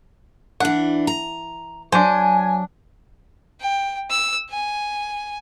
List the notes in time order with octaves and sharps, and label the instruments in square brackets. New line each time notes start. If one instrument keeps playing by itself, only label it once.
[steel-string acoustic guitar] E3 D4 [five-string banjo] F#5
[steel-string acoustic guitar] A#5
[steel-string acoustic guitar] F#3 [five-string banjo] D4 C5 [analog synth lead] G#5
[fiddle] G5
E6
G#5